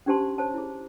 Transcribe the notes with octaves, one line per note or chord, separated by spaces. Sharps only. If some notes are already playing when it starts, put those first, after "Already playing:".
C#4 D4 G4 C5 A5 C6
C5 C#5 A5
E4 G#4